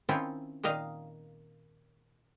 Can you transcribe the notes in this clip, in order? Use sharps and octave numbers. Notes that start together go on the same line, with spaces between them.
D#3 C4 C#4 E4 F4
A#2 D#3 D#5 F5